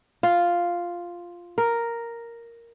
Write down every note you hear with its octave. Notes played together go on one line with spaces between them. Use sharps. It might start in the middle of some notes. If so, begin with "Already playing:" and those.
F4
A#4